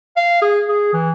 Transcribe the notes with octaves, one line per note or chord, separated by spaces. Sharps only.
F5
G#4
G#4
E3